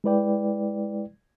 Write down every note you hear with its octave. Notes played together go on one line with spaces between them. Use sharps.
G#3 E4 B4 D5 G5